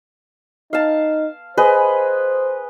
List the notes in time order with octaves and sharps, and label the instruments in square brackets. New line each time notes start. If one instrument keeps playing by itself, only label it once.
[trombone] D#4 [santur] F5 A5
[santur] G#4 B4 D#5 [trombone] C5